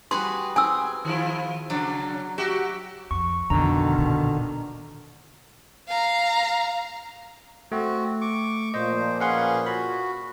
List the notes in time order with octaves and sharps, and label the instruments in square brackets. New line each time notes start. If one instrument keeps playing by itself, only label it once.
[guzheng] G3 F#4 G#4 [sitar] B4 [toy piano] C6
[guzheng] C4 G#4 [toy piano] G#5 E6
[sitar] D#3 F3 E4
[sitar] C#3 D4 [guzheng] F#3
[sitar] F#4 G4 [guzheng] E5
[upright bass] F2 [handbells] C#6
[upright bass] F2 [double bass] B2 D#3 [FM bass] D3 [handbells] A#5
[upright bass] A#2
[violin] F5 A#5
[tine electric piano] A3 [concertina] C4 F#4
[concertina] C#6 D6
[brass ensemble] A#2 F3 [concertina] C5 [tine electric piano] D#5
[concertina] C#4 G#4 B4 [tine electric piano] F5 F#5 C6
[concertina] F#4 [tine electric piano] B5